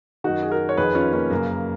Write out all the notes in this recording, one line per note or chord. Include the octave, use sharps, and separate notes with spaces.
F#2 D#3 D#4 F#4
G#4
F#4 A#4
C#5
F2 D#3 G#4 B4
C#4 F4
A#3 C#4
F#2 C#3 A#3